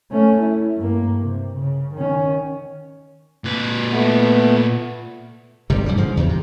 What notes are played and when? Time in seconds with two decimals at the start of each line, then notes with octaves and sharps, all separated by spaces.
0.11 A3 C#4
0.41 E4
0.77 G2 A#3
1.21 C3
1.54 C#3
1.95 D#3 C#4
3.44 A#2 B4
3.89 A3 B3
5.70 G1 C3 G3
5.86 F#2 B2 G3
5.97 G#2 D3 F3
6.17 E2 C#3
6.29 C3